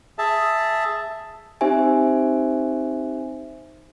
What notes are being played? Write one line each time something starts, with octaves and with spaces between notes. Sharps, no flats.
G#4 E5 A5
C4 D#4 G4 C5 E5 G#5